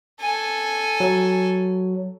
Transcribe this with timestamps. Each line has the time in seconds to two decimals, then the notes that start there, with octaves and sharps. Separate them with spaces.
0.21 A4 G#5
1.00 F#3